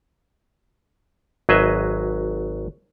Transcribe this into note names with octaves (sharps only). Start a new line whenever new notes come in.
G#1 F#3 G#4 B4 D#5 E5